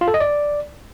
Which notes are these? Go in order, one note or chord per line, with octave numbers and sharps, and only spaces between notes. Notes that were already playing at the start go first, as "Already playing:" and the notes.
F4
A4
D#5
D5